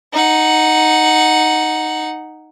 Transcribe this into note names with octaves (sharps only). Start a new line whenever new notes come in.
D#4 F#5